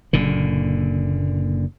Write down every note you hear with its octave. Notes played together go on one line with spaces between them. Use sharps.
F#1 A#2 D3